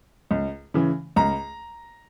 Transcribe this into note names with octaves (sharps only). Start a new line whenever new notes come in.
C#2
C#3 E3
C#2 A#5